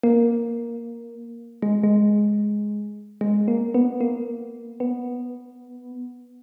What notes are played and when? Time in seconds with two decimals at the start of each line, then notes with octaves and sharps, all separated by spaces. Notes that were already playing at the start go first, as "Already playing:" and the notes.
0.04 A#3
1.62 G#3
1.83 G#3
3.21 G#3
3.48 A#3
3.74 B3
4.01 A#3
4.80 B3